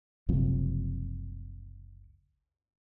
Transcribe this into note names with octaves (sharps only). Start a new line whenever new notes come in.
F#1 C#2 C3 F3